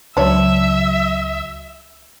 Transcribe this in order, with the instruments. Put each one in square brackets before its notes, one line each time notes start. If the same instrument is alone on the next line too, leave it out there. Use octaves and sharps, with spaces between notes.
[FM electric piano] C#2 C#3 F#3 [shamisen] D4 C#5 [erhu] E5